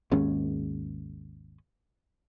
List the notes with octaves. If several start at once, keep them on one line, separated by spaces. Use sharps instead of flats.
G#1 D#2 G#3 C#4